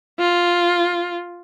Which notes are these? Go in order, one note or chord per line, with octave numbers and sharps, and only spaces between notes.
F4